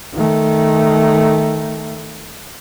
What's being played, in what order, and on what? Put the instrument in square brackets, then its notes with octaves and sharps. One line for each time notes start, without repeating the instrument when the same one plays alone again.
[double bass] D#3 A3